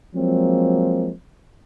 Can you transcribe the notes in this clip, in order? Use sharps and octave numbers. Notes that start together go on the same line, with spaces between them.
F3 F#3 G#3 A#3 C4